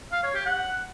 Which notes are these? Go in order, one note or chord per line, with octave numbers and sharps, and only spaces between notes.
F5
C#5
G4
F#5